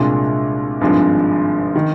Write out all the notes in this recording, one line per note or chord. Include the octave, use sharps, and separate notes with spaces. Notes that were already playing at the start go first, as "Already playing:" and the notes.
Already playing: C2 A#2 G#3 D4 F4
G#1 G2 F3 G#3 D4
D#3